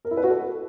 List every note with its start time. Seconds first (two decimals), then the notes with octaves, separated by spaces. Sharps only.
0.05 A#4
0.11 E4
0.17 B4
0.24 F#4
0.30 A4